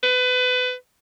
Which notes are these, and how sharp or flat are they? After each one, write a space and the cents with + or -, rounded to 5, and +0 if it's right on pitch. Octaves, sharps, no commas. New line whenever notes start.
B4 +25